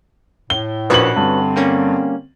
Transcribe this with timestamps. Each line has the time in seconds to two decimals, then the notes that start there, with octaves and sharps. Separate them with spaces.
0.50 A2 G7
0.90 A#1 C#4 F#4 B4 F#7
1.16 G2 D3 C4
1.56 G3 A#3 C#4